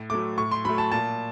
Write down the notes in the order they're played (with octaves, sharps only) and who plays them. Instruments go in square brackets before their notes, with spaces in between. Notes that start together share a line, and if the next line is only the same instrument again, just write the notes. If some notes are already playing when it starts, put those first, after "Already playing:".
Already playing: [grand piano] A2
F#3 A3 D6
A2 C#6
C6
F#3 A3 B5
A5
A#2 A5